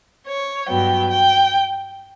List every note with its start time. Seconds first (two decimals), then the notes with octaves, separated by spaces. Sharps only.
0.27 C#5
0.68 G2 F#3 B3 G5
1.10 G5